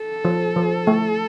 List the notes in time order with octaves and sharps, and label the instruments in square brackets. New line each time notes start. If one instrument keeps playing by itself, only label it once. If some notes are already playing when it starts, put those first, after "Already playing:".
Already playing: [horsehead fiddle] A4
[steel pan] F3
F3
A3